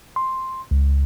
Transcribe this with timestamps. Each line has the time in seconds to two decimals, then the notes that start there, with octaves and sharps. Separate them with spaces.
0.16 C6
0.71 C#2